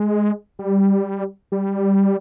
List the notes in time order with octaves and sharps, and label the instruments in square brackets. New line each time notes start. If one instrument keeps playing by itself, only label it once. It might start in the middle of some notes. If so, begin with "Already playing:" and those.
Already playing: [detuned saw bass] G#3
G3
G3